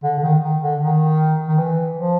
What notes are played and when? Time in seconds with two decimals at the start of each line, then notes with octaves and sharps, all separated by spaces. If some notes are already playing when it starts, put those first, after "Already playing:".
0.03 D3
0.18 D3
0.23 D#3
0.43 D#3
0.62 D3
0.81 D#3
1.48 D#3
1.58 E3
1.96 F3